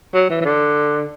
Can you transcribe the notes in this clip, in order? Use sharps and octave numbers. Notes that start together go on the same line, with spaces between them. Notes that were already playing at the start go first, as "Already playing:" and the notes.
F#3
E3
E3
D3